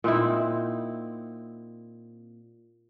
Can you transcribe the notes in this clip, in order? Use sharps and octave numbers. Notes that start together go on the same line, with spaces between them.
A#2 C4 D#4 E4